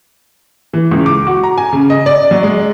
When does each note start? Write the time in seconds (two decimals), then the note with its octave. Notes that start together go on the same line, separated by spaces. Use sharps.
0.73 E3
0.91 C#2
1.06 D6
1.27 F#4
1.43 A#5
1.58 G#5
1.73 C#3
1.90 D#5
2.06 D5
2.31 F#3
2.43 G#3